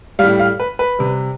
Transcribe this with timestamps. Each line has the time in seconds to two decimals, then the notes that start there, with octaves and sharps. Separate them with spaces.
0.19 G3 F5
0.23 A2
0.39 F5
0.60 B4
0.79 B4
0.99 C3 G3